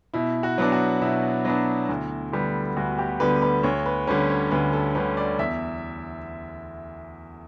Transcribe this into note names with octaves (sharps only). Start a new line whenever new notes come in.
B2 E4
F#4
F#3 B3 D4
F#4
B2 E4
F#3 B3 D4
D2
D3 G3 B3
D2 F#4
G4
D3 G3 B3 B4
B4
D2 C#5
B4
D3 G3 C#4 B4
C#5
D2 B4
A4
D3 G3 C#4 B4
D5
E2 E5